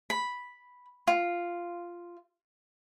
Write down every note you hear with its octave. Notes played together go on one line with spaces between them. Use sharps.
B5
F4